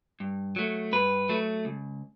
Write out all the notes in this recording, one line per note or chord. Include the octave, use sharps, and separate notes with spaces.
G2
F#3 A3
G2 B4
F#3 A3
C#2